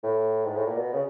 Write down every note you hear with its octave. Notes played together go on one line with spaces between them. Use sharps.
A2
G#2
A2
A#2
B2
C#3